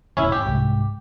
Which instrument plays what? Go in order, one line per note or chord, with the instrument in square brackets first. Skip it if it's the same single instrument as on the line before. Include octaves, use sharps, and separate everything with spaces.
[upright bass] D#1 E2 [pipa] C#4 E4
[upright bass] G#1 [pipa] G4
[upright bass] C2 G#2